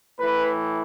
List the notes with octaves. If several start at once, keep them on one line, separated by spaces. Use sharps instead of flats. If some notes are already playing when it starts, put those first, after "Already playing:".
A2 E3 B4